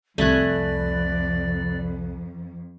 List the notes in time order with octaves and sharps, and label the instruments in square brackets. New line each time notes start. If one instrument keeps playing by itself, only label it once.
[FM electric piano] C2 B5 F#6 [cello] F2 [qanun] A3 G#5 [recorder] D5